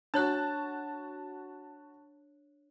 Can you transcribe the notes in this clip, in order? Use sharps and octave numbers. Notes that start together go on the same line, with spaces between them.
D4 F#4 C#5 A5 F#6